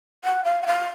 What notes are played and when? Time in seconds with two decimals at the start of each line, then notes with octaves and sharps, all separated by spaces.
0.24 F#5
0.44 F5
0.62 F#5
0.66 F5